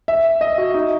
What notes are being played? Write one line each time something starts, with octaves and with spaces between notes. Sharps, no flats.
E5
D#5
F#4
D#4